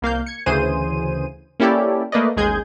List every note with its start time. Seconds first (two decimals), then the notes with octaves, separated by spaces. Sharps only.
0.02 C2 A#3 F5 G6
0.26 G#6 C#7
0.46 D2 C#3 E3 G#4 C5 D#7
1.60 A#3 C#4 E4 G4 A4 D5
2.12 A3 A#3 B4 D5 D#5
2.37 A1 D#2 G#3 G#4 G6 G#6